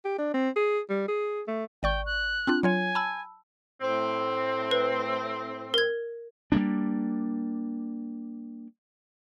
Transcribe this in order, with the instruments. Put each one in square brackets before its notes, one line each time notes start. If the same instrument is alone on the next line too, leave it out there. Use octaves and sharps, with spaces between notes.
[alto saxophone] G4
D4
C4
G#4
G3
G#4
A3
[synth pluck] G#1 D5 C#6 [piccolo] G5
[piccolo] F#6
[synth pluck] C4 D4 F4
[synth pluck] F#3 F4 C#5 [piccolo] G#5
[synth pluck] A5 B5 E6
[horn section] A2 C4
[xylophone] B4
A#4 G#6
[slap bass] G3 A3 A#3 D4